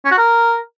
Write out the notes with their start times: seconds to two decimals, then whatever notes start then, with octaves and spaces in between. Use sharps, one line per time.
0.05 C#4
0.11 F#4
0.18 A#4